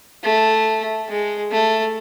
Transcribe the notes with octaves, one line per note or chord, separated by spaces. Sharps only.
A3
G#3
A3